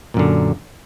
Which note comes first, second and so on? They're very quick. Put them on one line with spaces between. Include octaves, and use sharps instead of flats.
A#2 F#2 D3